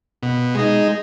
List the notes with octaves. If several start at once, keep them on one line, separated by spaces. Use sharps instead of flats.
B2
G#3 D#4